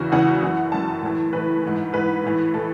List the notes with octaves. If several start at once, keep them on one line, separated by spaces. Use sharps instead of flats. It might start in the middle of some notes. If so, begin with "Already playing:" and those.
Already playing: E2 C#3 E3 F#4
E2 C#3 E3 F#5
F#2 E3
F#2 E3 A5
A2 E3
A2 E3 B4
G#2 E3
G#2 E3 B4
A2 E3
A2 E3 A4